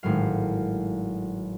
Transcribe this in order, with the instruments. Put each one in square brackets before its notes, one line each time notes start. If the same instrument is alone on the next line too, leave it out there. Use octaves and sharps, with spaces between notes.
[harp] G#1 A2 F#3 F5